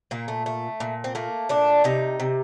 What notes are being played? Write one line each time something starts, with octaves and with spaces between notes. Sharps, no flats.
A#2 A#3
A3
A3
A#2
C4
A3 A#3
A#2 D4
C3 D#4
C3